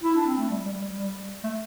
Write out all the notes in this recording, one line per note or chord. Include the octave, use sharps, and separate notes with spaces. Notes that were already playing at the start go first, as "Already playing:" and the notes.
E4
D4
C4
A3
G3
G3
G3
G3
A3